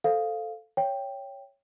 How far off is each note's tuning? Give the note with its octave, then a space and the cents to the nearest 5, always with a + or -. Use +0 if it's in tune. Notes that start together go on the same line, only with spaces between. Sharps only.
A4 +0 C5 +0 F5 +0
C#5 +0 E5 +25 G5 +0